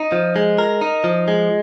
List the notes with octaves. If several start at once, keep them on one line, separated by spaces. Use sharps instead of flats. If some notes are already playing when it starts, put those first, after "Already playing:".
Already playing: D#4
F3
G#3
A#4
D#4
F3
G#3